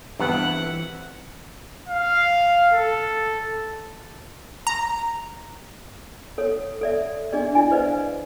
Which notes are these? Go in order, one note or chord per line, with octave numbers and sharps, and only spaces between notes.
G2 E3 B3 C4 E4 F#5
F5
A4
A#5
A4 C#5
A4 D5 E5
D4 G#4 D5 D#5
E4 D5 G#5
B4 C5 D5 D#5 F5